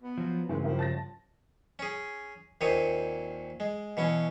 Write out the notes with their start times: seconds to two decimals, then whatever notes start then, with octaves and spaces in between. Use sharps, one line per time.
0.02 B3
0.18 F3 F#3
0.49 G2 C#3 E3 F#3 G#3 C4 A#4
0.64 F3 E4 G4 A#4
0.79 A5 A6 A#6
1.79 C#4 G#4
2.61 D#2 A#2 C4 C#5 D#6
3.60 G#3
3.97 B2 E3 C#4